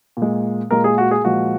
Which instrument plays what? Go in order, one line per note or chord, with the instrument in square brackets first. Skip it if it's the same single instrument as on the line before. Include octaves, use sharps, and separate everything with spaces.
[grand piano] A#2
G#3
A#2 G#3 A#4
G#4
F#4
G#4
A#2 F3 G#3 F#4